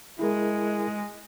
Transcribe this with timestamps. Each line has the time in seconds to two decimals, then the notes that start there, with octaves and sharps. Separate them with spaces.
0.19 G#3 E4 G#4 A#4